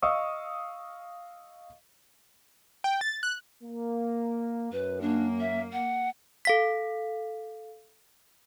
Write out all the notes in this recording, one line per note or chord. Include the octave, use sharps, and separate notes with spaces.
D#5 F5 C#6 D#6 E6
G5
A6
F#6
A#3
F#2 B4
A#3 D4
E5
F#5
A4 F5 B6